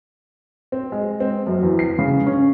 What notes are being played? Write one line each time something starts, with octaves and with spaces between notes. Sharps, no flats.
C4
G#3
C4
F#2
E2
C7
C#3
C#4